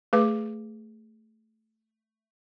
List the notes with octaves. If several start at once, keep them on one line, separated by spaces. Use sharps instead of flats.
A3 G#4 B4 D6